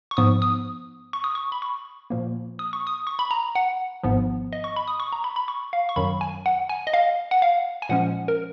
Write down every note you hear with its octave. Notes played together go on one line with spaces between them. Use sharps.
C#6
G#2 F3 B3 D#6
D#6
C#6
D#6
C#6
B5
C#6
A#2 F3 A#3
D#6
C#6
D#6
C#6
B5
A#5
F#5
G#1 G#2 F3 B3
D#5
C#6
B5
D#6
C#6
A#5
B5
B5
C#6
F5
C#6
F#2 D#3 F#3 B5
G#5
F#5
G#5
D#5
F5
F#5
F5
G#5
A#2 F3 G#3 C#4 F#5
A#4